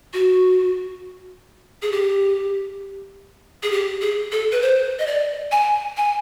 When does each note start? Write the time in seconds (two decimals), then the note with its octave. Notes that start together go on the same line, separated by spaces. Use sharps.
0.13 F#4
1.82 G#4
1.92 G4
3.63 G#4
3.72 G4
4.01 G#4
4.32 A4
4.52 B4
4.62 C5
4.99 D#5
5.07 D5
5.52 G#5
5.97 G#5